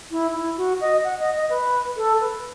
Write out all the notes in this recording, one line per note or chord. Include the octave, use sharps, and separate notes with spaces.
E4
E4
F#4
D#5
F#5
D#5
D#5
B4
A4
B4